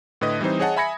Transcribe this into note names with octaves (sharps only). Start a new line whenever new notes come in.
A2 D3 B4 D#5 D#6
E3 G3 C4 D#4 C5
G#4 C#5 D#5 F#5 G#5 A5
E5 G#5 B5 G#6 A#6 C#7